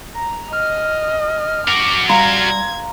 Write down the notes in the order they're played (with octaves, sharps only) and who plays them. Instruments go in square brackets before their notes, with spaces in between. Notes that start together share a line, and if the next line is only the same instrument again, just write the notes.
[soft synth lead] A#5
[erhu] D#5 [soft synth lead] F6
[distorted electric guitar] F#4 A#4 [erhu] D6
[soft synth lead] G3 [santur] F5 A#5 C6 [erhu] G#6